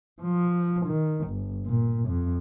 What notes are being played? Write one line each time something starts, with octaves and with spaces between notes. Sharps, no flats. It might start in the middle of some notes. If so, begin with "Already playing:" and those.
F3
D#3
G1
A#2
F2